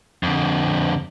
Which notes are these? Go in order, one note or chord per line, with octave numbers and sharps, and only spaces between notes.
F2 D3